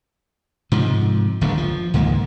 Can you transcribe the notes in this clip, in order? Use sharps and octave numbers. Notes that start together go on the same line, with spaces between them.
G#2 C3 F3
D1 A#1 G2 D3
F3
C#2 G#2 D#3 A#3